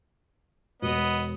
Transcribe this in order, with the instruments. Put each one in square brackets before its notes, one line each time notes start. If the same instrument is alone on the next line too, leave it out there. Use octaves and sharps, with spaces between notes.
[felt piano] E1 [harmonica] B3 D#5